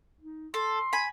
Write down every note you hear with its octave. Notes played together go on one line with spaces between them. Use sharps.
D#4
A4 C6
G#5 B5